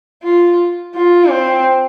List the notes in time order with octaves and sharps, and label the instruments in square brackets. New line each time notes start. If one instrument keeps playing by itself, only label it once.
[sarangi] F4
F4
C4